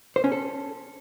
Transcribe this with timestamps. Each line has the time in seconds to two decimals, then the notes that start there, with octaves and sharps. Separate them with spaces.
0.16 C5
0.24 C#4
0.32 A4